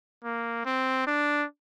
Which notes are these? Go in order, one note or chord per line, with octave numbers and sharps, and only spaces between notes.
A#3
C4
D4